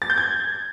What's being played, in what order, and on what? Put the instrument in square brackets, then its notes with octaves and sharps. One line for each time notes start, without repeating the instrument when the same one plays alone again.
[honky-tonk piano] A6
G6
G#6